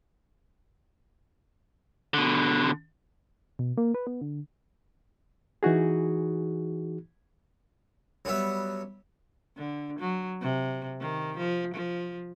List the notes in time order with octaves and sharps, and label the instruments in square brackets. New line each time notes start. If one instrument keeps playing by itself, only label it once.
[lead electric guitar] B2 D3
[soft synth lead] B2
A#3
B4
B3
D3
[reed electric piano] E3 D#4 F#4 G#4
[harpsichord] F#3 G3 B3 E5
[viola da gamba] D3
F#3
C3
D#3
F3
F3